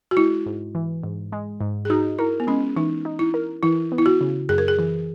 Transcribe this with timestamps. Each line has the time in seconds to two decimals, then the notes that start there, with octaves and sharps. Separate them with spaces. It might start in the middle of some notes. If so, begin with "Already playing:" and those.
0.11 F#4
0.17 G#3 E4
0.46 G#2
0.75 E3
1.04 G#2
1.32 G#3
1.61 G#2
1.85 G#4
1.90 D#4 F#4
2.19 E4 A#4
2.40 B3
2.47 G#3 C#4
2.76 E3 D#4
3.05 D#4
3.19 E4
3.34 A#4
3.63 E3 E4
3.92 B3
3.98 E4
4.06 F#4
4.21 C#3
4.49 F#2 G#4
4.58 A#4
4.68 G#4
4.79 E3